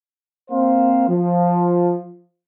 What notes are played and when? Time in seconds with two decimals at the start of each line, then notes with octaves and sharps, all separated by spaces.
0.51 A#3 C4 C5 F5
1.08 F3